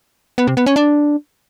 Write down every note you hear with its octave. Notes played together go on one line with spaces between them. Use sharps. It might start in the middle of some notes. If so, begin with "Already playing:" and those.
B3
C3
B3
C#4
D4